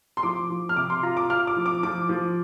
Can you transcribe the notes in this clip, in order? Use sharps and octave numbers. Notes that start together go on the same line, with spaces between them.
C6
F3 D6
F3
F6
C3 D6
C6
F4 A#5
D6
F4 F6
D6
F3
D6
F3 D6
F3